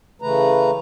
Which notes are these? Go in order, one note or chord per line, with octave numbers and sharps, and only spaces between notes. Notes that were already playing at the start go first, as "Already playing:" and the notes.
C#3 E3 A3 B4 A#5